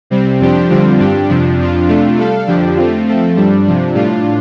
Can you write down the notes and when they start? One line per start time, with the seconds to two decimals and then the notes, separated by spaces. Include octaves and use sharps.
0.10 C3 G3 C4
0.40 F2 F3 D4 G4 C5
0.69 F2 D3 G3 C4 F4
0.99 G2 G3 D4 G4
1.29 F2 C3 F3 D4
1.59 F2 F3 D4 F4
1.88 C3 A3 D4 F4
2.17 G3 D4 A4 F5
2.47 F2 D3 F3 D4 G4
2.77 A3 C4 F4
3.06 F3 A3 C4 A4
3.36 G2 G3 D4
3.65 C3 F3 D4
3.95 A2 G3 D4 F4